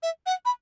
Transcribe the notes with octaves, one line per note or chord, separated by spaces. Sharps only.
E5
F#5
B5